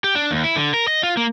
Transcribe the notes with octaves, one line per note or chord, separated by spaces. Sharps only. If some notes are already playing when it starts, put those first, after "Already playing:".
G4
D4
D#2
E4
D3
A#4
D#5
F4
A#3